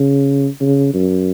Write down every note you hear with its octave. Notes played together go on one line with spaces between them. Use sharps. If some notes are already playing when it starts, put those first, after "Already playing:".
Already playing: C#3
C#3
F#2